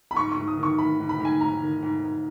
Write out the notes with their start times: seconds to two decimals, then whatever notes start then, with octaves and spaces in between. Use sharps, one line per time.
0.11 B5
0.16 G#2 C#6
0.32 C#6
0.37 G#2
0.48 D#6
0.57 D#3
0.63 C#6
0.78 D#3 B5
1.00 G#2
1.09 B5
1.20 G#2
1.25 G#5
1.41 G#2 A#5
1.62 D#3
1.82 G#2
2.03 G#2